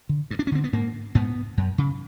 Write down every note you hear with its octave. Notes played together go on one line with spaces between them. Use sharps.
D3
G2
D4
C#4
D3 C4
B3
G#2 A#3
G#2 B3
F#2
C#3